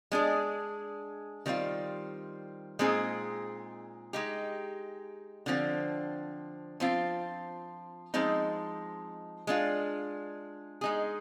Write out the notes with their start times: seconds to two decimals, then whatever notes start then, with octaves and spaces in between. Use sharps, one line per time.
0.12 G#3 D4 G#4
1.46 D#3 G3 C4 F4
2.79 A#2 G#3 C4 D#4 G#4
4.13 G#3 D#4 G4
5.46 D3 F3 C4
6.80 F3 C4 F4
8.14 F3 G#3 C4 D#4
9.47 G#3 D4 F4
10.81 G#3 D#4 G#4